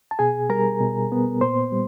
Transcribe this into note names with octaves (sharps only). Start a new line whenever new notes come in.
A5
B2 G#4 G#5
G3 A#4 A#5
B2
B3
A#2 C5 C6
G3